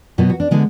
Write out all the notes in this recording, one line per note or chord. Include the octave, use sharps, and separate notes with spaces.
B2 F#3 B3 F#4
F#4
D4
D3 G#3 B3